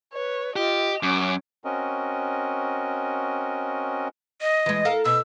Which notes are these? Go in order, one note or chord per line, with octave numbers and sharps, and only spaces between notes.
B4 C#5
F4 G4 D#5
F#2 C#4 D6
C4 C#4 F#4 A#4 D#5
D#5
E3 G#3
A4 A#4 F5
B2 E6